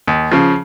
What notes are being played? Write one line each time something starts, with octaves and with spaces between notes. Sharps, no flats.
D#2
C#3 F3